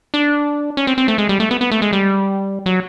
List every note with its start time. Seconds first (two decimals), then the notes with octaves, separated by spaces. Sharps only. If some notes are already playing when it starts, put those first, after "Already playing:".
0.14 D4
0.77 C#4
0.87 C4
0.98 C4
1.08 A3
1.18 G#3
1.29 G3
1.40 A3
1.51 B3
1.61 B3
1.71 A3
1.82 G#3
1.93 G3
2.66 F#3